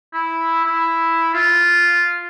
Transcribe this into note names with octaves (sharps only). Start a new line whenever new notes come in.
E4
E4
F4